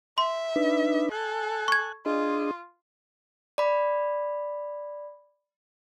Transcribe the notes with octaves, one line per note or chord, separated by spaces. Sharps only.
E5 C6
D4 D#4 B4
A4 G#5 F#6
C#6 G#6
D4 F4 G#4 D#5
D5 B5